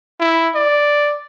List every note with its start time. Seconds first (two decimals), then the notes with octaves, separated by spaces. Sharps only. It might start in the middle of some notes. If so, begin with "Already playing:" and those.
0.20 E4
0.55 D5